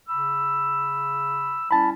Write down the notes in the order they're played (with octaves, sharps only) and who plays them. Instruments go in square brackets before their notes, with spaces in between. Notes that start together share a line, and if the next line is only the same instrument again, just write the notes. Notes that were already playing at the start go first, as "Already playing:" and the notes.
[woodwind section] C#3 B5 E6
[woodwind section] G3 C#4 E4 [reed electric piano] A5 B5